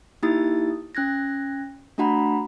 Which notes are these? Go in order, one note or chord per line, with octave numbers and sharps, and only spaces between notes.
A#3 D#4 E4 G4 D#6 A6
C#4 F#6 G#6 A#6
A3 D4 F#4 F#5 A#5 B5